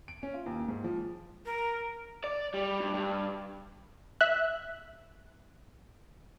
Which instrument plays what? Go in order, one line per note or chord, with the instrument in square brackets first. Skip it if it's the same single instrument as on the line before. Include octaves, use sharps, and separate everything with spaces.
[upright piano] D7
C#4
F4
D#2
G#2
F3
[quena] A#4
[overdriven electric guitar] D5
G3
G2
G2
[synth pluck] E5 F#6